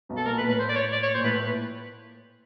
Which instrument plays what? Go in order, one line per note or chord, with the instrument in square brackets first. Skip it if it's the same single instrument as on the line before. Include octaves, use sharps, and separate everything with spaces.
[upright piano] B1 B2
[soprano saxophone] A4
[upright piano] A#2 [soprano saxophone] A#4
[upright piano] A#2 [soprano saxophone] B4
[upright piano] A2 [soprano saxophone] B4
[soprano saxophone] C5
D5
C#5
D5
C#5
[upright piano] A#2 [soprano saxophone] C5
[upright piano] A2 [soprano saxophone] B4
[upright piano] A#2 [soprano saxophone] B4